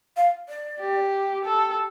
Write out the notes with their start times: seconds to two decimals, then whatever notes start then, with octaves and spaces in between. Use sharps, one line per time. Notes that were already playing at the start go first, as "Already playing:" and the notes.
0.17 F5
0.49 D5
0.81 G4
1.45 A4